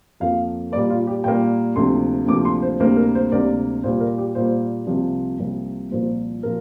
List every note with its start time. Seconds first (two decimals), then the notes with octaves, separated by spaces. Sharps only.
0.20 F2 F3 A#3 F5
0.72 A#2 G3 A#3 D5
0.90 F4
1.07 G4
1.24 A#2 G3 A#3 G5
1.76 D2 C3 F3 A#3 C6
2.27 D2 C3 F3 A#3 D6
2.45 C6
2.62 C5
2.80 D2 C3 G3 A#3 C5
2.97 A#4
3.15 C5
3.32 D2 C3 G3 A#3 D5
3.83 A#2 G3 A#3 C5
4.01 A#4
4.18 G4
4.35 A#2 G3 A#3 C5
4.87 C2 C3 F3 A#3
5.39 C2 C3 F3 A#3
5.91 C2 A#2 F3 A#3 C5
6.43 A#2 F3 A#4